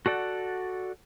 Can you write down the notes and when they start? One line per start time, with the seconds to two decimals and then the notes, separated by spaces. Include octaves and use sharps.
0.06 F#4 A4 D5 F#5